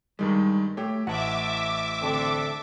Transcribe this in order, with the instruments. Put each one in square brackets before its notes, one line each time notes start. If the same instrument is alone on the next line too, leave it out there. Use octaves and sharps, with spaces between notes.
[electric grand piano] G2 D#3 G#3 [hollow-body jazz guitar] G3
[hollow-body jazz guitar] A3 A4 C#5 [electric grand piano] G4 G5
[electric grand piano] A1 A5 D7 [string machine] E5 D6 [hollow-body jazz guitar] F#5
[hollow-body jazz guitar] D2 [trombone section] C4 D4 A4